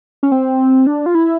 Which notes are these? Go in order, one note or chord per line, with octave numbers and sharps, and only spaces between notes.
C#4
C4
D4
F4
E4